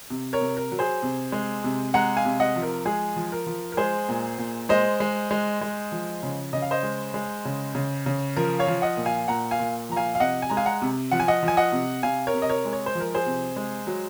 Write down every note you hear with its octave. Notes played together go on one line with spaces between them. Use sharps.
C3
A#4 C#5
C3
A#4
F#3
G#4 C5
C3
G#3
C3
G#3 F#5 A#5
F5 G#5
C3
D#5 F#5
F3
A#4
G#3 G#4
F3
A#4
F3
A#4
G#3 G#4 C5
A#2
A#2
G#3 C5 D#5
G#3
G#3
G#3
F3
C#3
C#3 D#5
F5
C5 D#5
G#3
G#3
C#3
C#3
C#3
F3 A#4
C#5 F5
F3
D#5 F#5
A#2
F5 G#5
A#2 F#5 A#5
F5 G#5
A#2
F3 A#5
F5 G#5
F5
C3 D#5 F#5
G#5
G#3 A#5
F5 G#5
F#5 A#5
C3
F3 F#5
G#5
D#5 F#5
F3
G#5
D#5 F#5
C3
C3 F5 G#5
A#4 C#5
C3
D#5
A#4 C#5
G#3
C#5
C5
F3
A#4
G#4 C5
C3
G#3
F#3